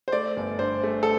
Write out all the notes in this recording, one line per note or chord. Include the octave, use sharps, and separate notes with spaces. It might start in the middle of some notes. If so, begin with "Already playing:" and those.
C5
A3 D5
G1
G2 C5
A3
A4